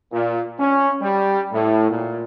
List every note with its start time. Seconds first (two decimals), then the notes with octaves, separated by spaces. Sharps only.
0.11 A#2
0.59 C#4
1.02 G3
1.52 A2
1.90 A#2